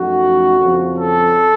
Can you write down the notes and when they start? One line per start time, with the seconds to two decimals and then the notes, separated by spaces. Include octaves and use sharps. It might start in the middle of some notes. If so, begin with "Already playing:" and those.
Already playing: F#2 F3 A3 D#4 F#4
0.59 F2 C#3 F3
0.97 A4